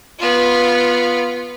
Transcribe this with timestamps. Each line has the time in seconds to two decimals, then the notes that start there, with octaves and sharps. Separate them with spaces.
0.19 B3 F4